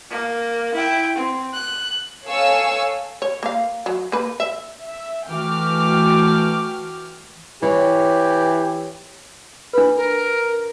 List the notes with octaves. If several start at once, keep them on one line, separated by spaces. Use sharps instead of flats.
A#3
E4 G5
C4
F#6
A4 C#5 F5 G#5 C#6 E6
C#5
A#3 F5
F#3
A#3 B4
E5
E5
E3 A3 F#4 G5 D6 F6
E3 G4 C#5
D4 B4 B5
A#4